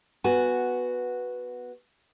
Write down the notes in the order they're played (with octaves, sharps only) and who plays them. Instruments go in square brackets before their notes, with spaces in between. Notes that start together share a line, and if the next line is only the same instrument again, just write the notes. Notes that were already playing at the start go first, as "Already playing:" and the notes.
[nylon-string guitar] B3 F#4 G#5